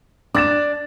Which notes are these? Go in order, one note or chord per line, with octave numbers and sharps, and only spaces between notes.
D4 D6 A6 E7